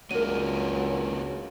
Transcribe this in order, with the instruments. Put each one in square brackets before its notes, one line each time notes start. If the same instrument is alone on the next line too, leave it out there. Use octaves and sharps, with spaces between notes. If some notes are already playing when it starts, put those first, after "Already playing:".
[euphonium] C#2 [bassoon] F#3 [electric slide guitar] A#3 D4 F#4 [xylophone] A#4 D#7